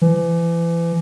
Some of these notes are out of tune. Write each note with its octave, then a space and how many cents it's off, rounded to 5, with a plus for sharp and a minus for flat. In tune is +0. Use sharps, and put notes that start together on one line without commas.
E3 +35